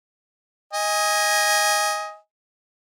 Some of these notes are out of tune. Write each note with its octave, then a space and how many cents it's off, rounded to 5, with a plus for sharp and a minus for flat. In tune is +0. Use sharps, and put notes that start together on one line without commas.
D#5 +15 G#5 -15